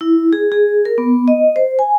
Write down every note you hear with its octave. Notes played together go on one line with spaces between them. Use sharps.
E4
G#4
G#4
A#4
B3
D#5
C5
G#5